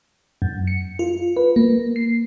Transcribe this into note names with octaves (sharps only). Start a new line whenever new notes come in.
F#2
C#7
F4
B4
A#3
C7